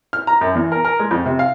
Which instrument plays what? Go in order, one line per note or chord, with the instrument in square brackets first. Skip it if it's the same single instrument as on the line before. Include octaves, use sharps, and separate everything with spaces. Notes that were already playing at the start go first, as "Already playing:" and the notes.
[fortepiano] F6
A#5
F#2
E2
A#4
A#4
G#3
F2
C3
F5